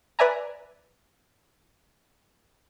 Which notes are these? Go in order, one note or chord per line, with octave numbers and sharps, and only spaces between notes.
B4 D5 E5 G#5 A#5